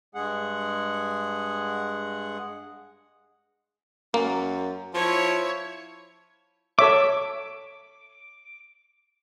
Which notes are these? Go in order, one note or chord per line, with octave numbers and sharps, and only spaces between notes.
G2 G#3 G#4 F#5
F#2 A#3
F3 E4 C#5
A4 C#5 E5 D6